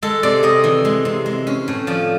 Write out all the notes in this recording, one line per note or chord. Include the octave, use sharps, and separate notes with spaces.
G#3 A4
C3 D5
C3 D#5
E3
G#3
C3
G#3
C#4
A2
F3 D5